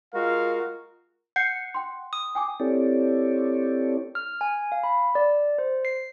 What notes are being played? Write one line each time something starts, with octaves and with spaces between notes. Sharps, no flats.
G#3 F4 F#4 A#4 F5
F#5 G6 C7 C#7
G5 C6
D#6
G5 G#5 D6
C4 E4 G4 A4 C#5 D5
F6
G#5
F5
B5
D5
C5
C7